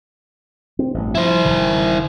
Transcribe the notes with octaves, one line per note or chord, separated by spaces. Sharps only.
C4
A1 G2
F3 E4 C5
E1 D#3